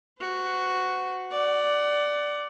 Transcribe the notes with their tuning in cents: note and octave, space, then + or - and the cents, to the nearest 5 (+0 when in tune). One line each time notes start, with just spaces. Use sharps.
F#4 +0 C5 -45
D5 +0 F#5 +25